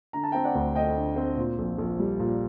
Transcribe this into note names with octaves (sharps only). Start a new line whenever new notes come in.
D3 A#5
A5
C4 G5 A#5
D5 F#5
D2
A3 D#5 G5
D3
C4
A#2
A#1
A#1
G3
A#2